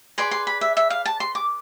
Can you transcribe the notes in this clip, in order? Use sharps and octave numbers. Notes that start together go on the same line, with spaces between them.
G#4 B4 D5 C6
C6
B5
E5
E5
F5
A5
C6
D6